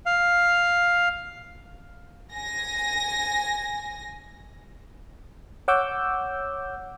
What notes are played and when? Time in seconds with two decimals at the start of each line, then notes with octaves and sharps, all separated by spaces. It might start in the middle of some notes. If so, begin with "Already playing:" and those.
0.06 F5
2.33 G#5 A#6
5.68 C#5 F#5 D6 E6 G6